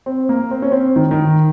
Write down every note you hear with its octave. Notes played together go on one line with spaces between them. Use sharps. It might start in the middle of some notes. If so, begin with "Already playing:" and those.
C4
A#3
C4
C#4
C4
D#3
D#3